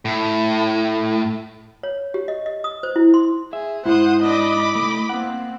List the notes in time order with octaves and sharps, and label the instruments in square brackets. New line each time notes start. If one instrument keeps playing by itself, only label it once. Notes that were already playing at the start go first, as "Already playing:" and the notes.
[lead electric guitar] A2
[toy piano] C#5
G4
D#5
D#5
D#6
C5
E4
C6
[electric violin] G#4 [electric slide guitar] E5
[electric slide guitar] G#2 [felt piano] E4 [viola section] C5 [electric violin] F#5 D#6
[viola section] D4 D#5 [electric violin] B5 D6
[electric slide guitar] C3 A3 [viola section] D#5
[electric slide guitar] A#3 F#5 [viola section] C4